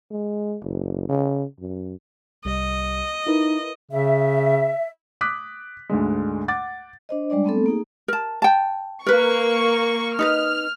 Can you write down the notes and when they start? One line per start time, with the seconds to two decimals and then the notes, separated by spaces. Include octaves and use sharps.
0.11 G#3
0.62 F#1
1.09 C#3
1.60 F#2
2.45 C2 G3 D#5
3.27 D#4 E4 A#4 B4
3.92 C#3 E5
5.21 D6 D#6 F#6 B6
5.90 D2 G#2 D3 G#3
6.48 F#5 D6 A6
7.09 D4 C5 D#5
7.30 G3 G#3 D4 D5
7.44 A3 B3 C4 A4
7.66 A#3 D#4 G#4
8.08 A#4 A5
8.42 G5 A5
9.06 A#3 A#4 B4 C#6
10.19 D#4 B4 D#5 F6